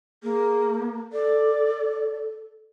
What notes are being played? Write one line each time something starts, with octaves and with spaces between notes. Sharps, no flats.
A#3 G#4
A4 D5